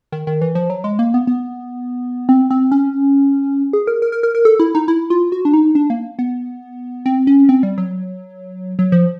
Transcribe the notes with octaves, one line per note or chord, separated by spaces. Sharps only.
D#3
D#3
E3
F3
F#3
G#3
A#3
B3
B3
C4
C4
C#4
G#4
A#4
A#4
A#4
A#4
A#4
A4
E4
D#4
E4
F4
F#4
D4
D#4
D4
A#3
B3
C4
C#4
C4
G3
F#3
F#3
F3